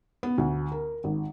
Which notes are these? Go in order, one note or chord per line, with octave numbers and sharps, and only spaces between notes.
B3
D2
A#4
G#1